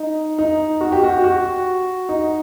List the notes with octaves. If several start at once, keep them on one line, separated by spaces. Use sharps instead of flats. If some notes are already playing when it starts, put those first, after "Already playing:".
Already playing: D#4
D#4
F#4
G4
F#4
F#4
D#4